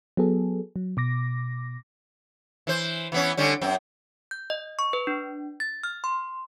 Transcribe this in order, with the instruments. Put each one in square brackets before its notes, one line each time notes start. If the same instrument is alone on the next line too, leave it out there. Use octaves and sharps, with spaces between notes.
[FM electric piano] F#3 B3 G#4 A4
F#3
B2 D6 A#6
[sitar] E3 C5
E3 B3 C#4
D3 G3 C#4
F#2 C4
[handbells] G6
D#5
C#6
B4
D4
A6
F6
C6